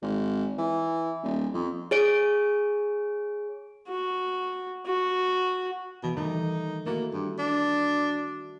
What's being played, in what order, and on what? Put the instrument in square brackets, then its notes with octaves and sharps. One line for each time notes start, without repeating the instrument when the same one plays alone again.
[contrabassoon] G#1
E3
D#1
F2
[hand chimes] G#4 C#5 D7
[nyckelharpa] F#4
F#4
[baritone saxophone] B2 [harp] E3
[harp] D#3 G3 A3 [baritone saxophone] D#4
[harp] A3 E4 F#4 [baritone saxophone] A#3
[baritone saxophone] G2
D4